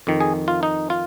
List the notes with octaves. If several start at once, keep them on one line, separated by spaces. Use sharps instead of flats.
F2 D#3
G#4
F4
D#4
F4